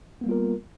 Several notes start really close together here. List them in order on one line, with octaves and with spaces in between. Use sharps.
B3 A#3 G3 F4 A#4